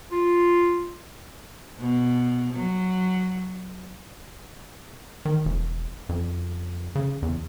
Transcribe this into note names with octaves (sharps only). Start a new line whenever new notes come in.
F4
B2
F#3
D#3
E1
F2
C#3
E2